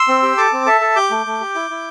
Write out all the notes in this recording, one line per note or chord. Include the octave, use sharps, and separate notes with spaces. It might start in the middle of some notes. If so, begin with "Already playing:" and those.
Already playing: C6 E6
C4
G4
A4 A5 D6
C4
A4 E5 A5
A4
G4 D6 G6
A3
A3
G4
E4
E4